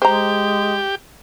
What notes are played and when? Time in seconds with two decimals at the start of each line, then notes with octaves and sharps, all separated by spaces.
0.02 G#3 G4 C5 A#5